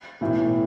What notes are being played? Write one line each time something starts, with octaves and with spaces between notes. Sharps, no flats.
B1 A2 E3